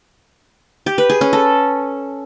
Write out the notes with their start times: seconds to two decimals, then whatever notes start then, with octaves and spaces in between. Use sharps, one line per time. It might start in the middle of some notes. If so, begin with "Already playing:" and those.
0.86 G4
0.98 B4
1.10 G#4
1.21 C#4
1.33 A4